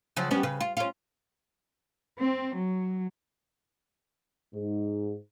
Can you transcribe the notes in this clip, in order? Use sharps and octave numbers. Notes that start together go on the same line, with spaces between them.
C#3 F3 F#3
G3 B3 C#4
C#3 B4
F4
C#4 F4
C4
F#3
G#2